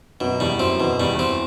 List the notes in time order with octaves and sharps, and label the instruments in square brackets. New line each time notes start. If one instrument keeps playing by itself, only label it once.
[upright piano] F#2 [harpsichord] B2
[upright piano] E2 [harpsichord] G3
[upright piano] F#2 [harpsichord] C4
[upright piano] E2 [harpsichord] B2
[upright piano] E2 [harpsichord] G3
[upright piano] E2 [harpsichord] C4